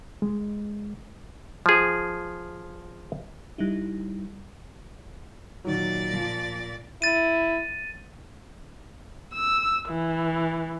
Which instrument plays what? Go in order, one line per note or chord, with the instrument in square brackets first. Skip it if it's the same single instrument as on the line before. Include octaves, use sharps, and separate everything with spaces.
[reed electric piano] G#3
[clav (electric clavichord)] F3 G#4
[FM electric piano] G3 D#4 E4
[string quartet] A#2 D5 A6 [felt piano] D#3 F#3
[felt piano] F3
[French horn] E4 [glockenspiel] A6 D#7
[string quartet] E6
E3